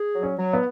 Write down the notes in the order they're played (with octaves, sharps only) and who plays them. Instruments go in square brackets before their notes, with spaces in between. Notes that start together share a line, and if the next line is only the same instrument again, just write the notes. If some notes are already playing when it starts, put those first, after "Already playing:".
Already playing: [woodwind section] G#4
F#3
[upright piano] C#4
[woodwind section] F#3
[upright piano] B3